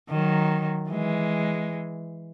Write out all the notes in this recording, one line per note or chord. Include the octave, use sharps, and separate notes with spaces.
D#3 F#3
E3 G#3